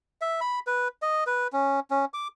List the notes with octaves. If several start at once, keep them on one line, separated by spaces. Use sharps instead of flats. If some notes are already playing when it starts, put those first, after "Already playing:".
E5
B5
B4
D#5
B4
C#4
C#4
D6